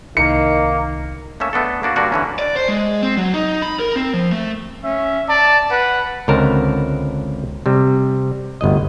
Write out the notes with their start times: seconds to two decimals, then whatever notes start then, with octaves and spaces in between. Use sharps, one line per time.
0.17 C2 D#3 A#3 C#7
1.40 A3 A#3 C#4 E5
1.53 A3 B3 D4 A4
1.83 A#3 D4 F#4
1.96 G2 D3 A#3 D4 F#4 A#4
2.12 D3 E3 C#4
2.39 D5
2.56 C5
2.69 G#3
3.02 C4
3.18 F#3
3.34 D#4
3.62 B5
3.79 A#4
3.96 C4
4.14 F3
4.32 A3
4.84 C#4 E5
5.29 D5 A5
5.71 B4 F#5
6.28 C#2 D3 C4 A#4 F#5 A5
7.66 C3 G3
8.61 G1 D2 D#5